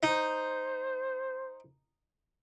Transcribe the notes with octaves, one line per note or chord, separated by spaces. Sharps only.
D#4 C5